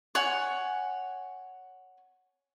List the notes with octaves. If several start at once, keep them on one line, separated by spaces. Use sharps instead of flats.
C#5 F#5 G#5